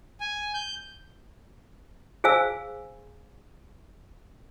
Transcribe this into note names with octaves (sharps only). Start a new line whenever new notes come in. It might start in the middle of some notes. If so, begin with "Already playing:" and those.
G#5
G6
G#4 C5 F5 G#5 E6